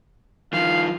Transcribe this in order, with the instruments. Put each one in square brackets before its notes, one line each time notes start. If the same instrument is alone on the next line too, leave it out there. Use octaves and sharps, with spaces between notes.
[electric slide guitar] D#3 F3 [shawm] F5